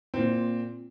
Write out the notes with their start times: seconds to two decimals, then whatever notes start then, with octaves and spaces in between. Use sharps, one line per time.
0.14 A#2 C4